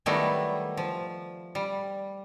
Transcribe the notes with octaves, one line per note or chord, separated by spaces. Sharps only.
D#3 F#3 G3 A3 B3 E4
F3
G3